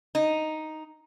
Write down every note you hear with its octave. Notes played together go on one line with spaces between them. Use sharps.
D#4